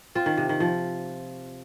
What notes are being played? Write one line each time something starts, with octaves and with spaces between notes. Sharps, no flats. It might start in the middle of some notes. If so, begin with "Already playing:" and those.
C4 F4
D#3
C3
D#3
F3